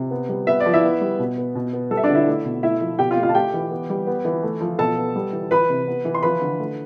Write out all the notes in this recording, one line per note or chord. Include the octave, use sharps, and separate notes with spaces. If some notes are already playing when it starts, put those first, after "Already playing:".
Already playing: C3
B3
G3
B3 E5
D5
F3
E4 E5
B3
G3
B2
B3
B2
B3
G3 A4
E5
D4 D5
D3
E4 E5
A3
B2
A3 E4 E5
F3
B2 G4 G5
F4 F5
A3
F4 F5
A5
A3 G4 G5
E3
B3
G3
B3
E3
A3
F3
B2 A4 A5
B3
G3
E3
E3 B4 B5
C3
B3
E3
C6
F3 B4 B5
D3
A3